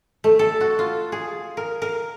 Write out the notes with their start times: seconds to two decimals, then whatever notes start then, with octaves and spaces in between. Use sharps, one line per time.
0.24 A3
0.39 A4
0.61 F#4
0.79 F4
1.12 G#4
1.57 A#4
1.82 A#4